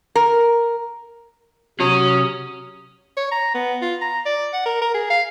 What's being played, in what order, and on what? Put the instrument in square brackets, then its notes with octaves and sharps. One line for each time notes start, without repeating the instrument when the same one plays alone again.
[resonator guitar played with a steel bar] A#4
[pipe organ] C3 D#6 [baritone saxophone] F#3 [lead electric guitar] C#4
[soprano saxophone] C#5
A#5
B3
F4
A#5
D5
F#5
A#4
A#4
G#4
F5